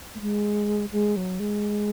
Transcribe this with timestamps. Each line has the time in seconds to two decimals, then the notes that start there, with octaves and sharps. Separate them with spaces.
0.15 A3
0.21 G#3
0.92 G#3
1.17 F#3
1.40 G#3